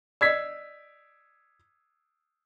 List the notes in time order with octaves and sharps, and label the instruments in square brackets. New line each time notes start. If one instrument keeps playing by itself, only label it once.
[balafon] D5 D#5 [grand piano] E6 G#6 B6